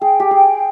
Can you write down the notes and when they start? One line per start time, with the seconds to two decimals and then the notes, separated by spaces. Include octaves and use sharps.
0.01 G#4 G5
0.20 G4
0.31 G#4 G5